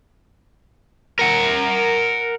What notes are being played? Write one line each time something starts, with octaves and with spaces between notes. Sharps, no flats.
A#4 F#5